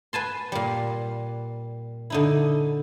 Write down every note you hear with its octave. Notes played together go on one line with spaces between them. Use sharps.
B4 G#5 A5 C6
A#2 G3
D3 D#4 E4